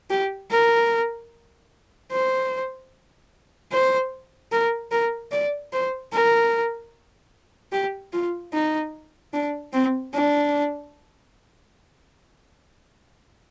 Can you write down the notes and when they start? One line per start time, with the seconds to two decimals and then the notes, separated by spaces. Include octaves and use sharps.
0.10 G4
0.51 A#4
2.11 C5
3.72 C5
4.52 A#4
4.91 A#4
5.32 D5
5.73 C5
6.12 A#4
7.72 G4
8.13 F4
8.53 D#4
9.33 D4
9.73 C4
10.13 D4